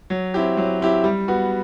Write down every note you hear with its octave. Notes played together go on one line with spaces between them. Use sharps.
F#3
C4 E4 G4
F#3
C4 E4 G4
G3
B3 F#4